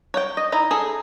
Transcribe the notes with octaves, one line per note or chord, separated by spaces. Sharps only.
C#5 F#5 G5
D#5
D#4 E4 A#5
G#4 A4